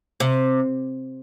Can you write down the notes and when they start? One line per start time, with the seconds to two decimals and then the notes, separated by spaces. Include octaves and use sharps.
0.20 C3